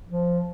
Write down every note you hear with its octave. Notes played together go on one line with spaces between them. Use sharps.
F3